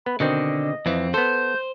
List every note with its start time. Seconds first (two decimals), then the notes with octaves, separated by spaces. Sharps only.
0.06 B3 B5
0.20 B2 D3 D#3 C4 D#5
0.86 F2 E3 C4
1.14 B3 A4 C5 G6